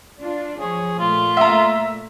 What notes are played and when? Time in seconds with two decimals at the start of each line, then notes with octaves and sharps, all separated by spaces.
0.19 D4 F4
0.59 F3 G#4 C#5
0.99 A#2 A3 F4
1.37 E5 A#5